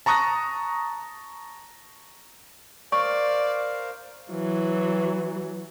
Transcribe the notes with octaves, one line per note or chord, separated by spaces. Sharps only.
A5 A#5 C#6 D#6 F#6 A#6
A#4 C5 D5 F5 C#6
E3 F#3